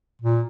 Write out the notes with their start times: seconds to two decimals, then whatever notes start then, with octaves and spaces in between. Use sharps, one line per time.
0.22 A#2